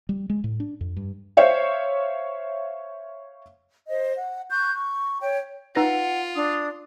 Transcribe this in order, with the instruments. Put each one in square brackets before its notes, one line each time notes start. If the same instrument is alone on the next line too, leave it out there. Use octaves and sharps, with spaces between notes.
[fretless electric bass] G3
G#3
A2
D4
F2
G2
[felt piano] C5 C#5 E5 F5
[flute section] C5 D#5
F#5
C#6 F#6 G6
C#6
C#5 G5
[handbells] D#4 B4 A#6 [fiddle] F4 [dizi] F#5
[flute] D4 [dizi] D#6